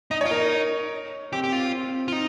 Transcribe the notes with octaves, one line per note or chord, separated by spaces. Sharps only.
D#4 D#5
F4 C#5
D#4 A#4
C4 G4
G4
F4
C4
F4
D#4